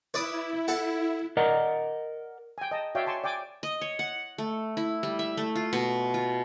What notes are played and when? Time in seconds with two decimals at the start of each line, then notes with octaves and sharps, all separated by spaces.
0.14 E4 B4 D5 D#6
0.68 A4 F#5
1.37 A#4 D5 D#5 F#5 A#5
2.58 G5 G#5
2.71 D#5 A5
2.95 F#4 C#5 D5 E5 F5 G5
3.06 G#5 A5 C6 C#6
3.24 D5 G5 G#5 D6
3.63 D#5
3.81 C#5
3.99 F#5
4.38 A3
4.77 E4
5.03 G3
5.19 E5
5.37 A3
5.55 F4
5.73 B2
6.14 F4